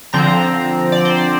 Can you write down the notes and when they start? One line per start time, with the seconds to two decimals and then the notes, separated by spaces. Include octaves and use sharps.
0.13 D3 F3 C4 A#5
0.92 D5
1.05 C5
1.18 D5